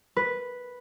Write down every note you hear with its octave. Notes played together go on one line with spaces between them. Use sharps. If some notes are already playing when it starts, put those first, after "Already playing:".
B4